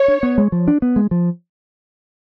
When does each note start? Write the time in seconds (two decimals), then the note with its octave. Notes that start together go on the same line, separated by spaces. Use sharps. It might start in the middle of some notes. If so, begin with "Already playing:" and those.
Already playing: C#5
0.08 D4
0.23 B3
0.38 G#3
0.52 F3
0.68 D4
0.82 B3
0.96 G#3
1.11 F3